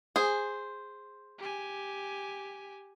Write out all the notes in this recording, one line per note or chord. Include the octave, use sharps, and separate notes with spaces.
G#4 C5
G4 G#5